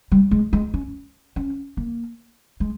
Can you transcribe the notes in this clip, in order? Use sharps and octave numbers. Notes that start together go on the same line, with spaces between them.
G3
G#3
G#3
C#4
C#4
A#3
G#3